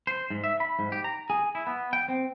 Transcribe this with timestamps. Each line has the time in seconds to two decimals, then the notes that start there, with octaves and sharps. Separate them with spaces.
0.07 C5
0.30 G#2
0.44 E5
0.60 B5
0.79 G#2
0.92 G4
1.04 A#5
1.30 G#4
1.55 E4
1.67 B3
1.93 G5
2.08 C4